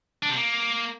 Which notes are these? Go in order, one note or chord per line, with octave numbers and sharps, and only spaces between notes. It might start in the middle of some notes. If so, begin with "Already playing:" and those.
D4
C3
A#3